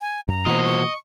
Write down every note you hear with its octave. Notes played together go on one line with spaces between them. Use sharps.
G#5
F#2 A#5
B2 E3 A#3 F4 F#4 C5 D#5
C#6